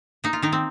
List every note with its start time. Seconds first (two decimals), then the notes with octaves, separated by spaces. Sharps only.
0.24 A#3 D#4
0.33 F4
0.42 D#3 D#4
0.52 C4